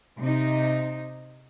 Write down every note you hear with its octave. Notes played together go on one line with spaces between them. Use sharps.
C3 D#4